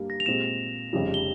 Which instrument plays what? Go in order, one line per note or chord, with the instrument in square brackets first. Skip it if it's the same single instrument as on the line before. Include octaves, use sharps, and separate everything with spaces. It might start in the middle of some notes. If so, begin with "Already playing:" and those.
Already playing: [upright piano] G2 G3 A#3
[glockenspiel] A#6
F7
[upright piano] A#2 G#3 C4 G4 [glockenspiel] E7
[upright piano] F1 F2 C#3 G3
[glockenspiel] G7